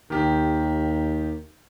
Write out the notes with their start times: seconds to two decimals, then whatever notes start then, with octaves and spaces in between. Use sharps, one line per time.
0.10 D#2 D#3 G4